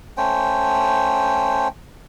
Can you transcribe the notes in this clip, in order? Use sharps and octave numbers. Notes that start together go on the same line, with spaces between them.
A3 C#4 C5 G5